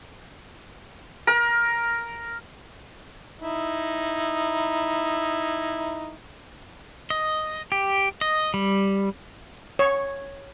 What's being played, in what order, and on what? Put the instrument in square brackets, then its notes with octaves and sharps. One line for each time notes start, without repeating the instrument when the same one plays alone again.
[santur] A#4
[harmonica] D#4 E4
[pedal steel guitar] D#5
G4
D#5
G3
[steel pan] C#5